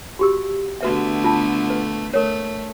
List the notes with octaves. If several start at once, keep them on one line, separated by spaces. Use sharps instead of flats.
F#4 G4 E6
D3 A3 B3 F#4 B4 E5
F4 A5
B4
A3 A#4 C#5